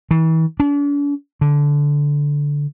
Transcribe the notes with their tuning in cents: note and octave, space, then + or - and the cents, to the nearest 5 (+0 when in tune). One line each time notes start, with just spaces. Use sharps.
E3 -35
D4 -45
D3 -10